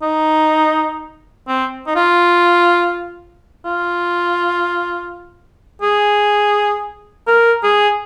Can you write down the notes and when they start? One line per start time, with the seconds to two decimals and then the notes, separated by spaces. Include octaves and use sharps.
0.02 D#4
1.48 C4
1.87 D#4
1.96 F4
3.65 F4
5.82 G#4
7.27 A#4
7.63 G#4